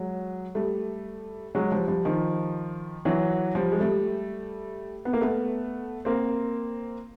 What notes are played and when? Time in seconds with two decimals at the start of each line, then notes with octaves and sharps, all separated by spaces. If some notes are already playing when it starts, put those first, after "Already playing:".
Already playing: F#3 G#3
0.55 G3 A3
1.55 F#3 G#3
1.72 F3 G3
1.88 F3 G3
2.05 D#3 F3
3.05 E3 F#3
3.55 F3 G3
3.72 G#3
3.80 G3 A3
5.05 B3
5.13 A#3
5.21 A3 B3
6.05 A#3 C4